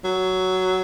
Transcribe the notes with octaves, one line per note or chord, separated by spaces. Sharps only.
F#3